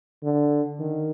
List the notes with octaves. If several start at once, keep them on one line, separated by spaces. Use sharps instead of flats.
D3
D#3